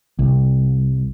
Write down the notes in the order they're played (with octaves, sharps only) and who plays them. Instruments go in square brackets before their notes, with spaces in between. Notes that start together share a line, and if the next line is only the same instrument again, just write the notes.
[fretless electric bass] C2